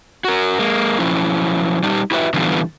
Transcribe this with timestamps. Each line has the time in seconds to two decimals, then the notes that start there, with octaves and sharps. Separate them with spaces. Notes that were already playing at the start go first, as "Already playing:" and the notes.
0.24 F#4 A#4
0.59 G#3 A#3
0.99 F3 F#3 C#4 E4
1.83 G3 D#4 G4
2.11 E4 F#4 G4 A4 B4 E5
2.34 D3 E3 G3 B3 F4